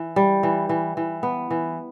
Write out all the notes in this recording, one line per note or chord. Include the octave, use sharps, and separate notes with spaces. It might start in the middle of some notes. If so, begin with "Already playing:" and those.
Already playing: E3
G3
E3
E3
E3
B3
E3